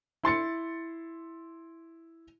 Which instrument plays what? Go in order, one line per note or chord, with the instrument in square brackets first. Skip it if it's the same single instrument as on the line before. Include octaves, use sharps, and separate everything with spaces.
[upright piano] E4 C6 A6 C#7